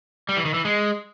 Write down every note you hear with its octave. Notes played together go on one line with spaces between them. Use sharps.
G3
E3
D#3
E3
G#3